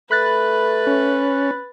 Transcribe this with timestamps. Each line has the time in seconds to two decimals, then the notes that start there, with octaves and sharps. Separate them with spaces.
0.11 A3 B4 B5 F#6 A6
0.87 C#4